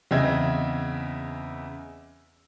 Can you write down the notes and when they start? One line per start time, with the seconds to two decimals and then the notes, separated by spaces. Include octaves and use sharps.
0.11 E2 C#3 C4 D#5 E5 G#6